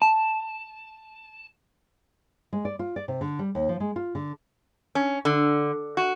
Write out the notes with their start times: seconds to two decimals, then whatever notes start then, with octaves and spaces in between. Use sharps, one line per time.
0.02 A5
2.53 G#3
2.65 D5
2.79 F4
2.96 D5
3.08 C3
3.21 D3
3.39 G3
3.55 D#2
3.69 F3
3.80 G#3
3.96 F4
4.15 D3
4.95 C#4
5.25 D3
5.97 F#4